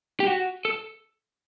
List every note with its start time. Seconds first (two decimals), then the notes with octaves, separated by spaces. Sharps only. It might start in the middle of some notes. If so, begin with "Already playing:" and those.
0.20 G4
0.27 F#4
0.65 A4